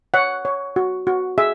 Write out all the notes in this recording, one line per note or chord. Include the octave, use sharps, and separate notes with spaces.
C#5 F#5
C#5
F#4
F#4
G#4 E5